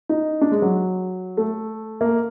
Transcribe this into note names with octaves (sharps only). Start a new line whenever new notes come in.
D#4
D4
G#3
F#3
A3
A#3